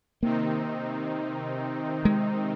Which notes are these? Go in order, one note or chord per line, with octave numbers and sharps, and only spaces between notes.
C3 D#3 A#3 C4 D#4
G#3